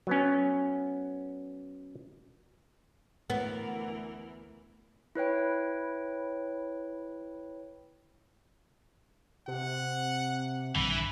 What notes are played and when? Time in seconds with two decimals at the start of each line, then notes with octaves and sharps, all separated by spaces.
0.07 F#3 B3 C#4
3.30 D2 E3 B3 A#4
5.15 E4 B4 C#5 G5
9.48 C3 F#5
10.75 A#1 G2 D3 E3 B5